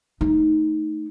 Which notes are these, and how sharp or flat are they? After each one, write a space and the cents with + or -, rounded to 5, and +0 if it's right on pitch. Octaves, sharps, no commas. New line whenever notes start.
A3 -5 D#4 +0